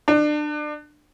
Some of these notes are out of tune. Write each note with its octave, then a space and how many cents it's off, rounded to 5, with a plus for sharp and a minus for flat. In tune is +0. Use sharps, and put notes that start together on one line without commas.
D4 +30